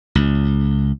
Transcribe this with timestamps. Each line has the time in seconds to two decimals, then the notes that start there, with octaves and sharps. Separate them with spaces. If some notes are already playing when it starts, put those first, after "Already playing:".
0.15 C#2